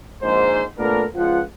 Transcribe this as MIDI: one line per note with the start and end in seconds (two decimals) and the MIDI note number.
0.22 0.63 34
0.22 0.63 44
0.22 0.63 72
0.78 1.04 46
0.78 1.04 57
0.78 1.04 59
0.78 1.04 62
0.78 1.04 69
0.78 1.04 70
1.16 1.41 37
1.16 1.41 53
1.16 1.41 65
1.16 1.41 78